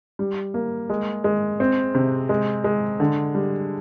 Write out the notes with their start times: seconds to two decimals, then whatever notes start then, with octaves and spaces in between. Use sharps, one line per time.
0.19 G3
0.54 A#3
0.90 G#3
1.24 G#3
1.60 C4
1.94 C3
2.29 G#3
2.64 G#3
3.00 D3
3.35 G3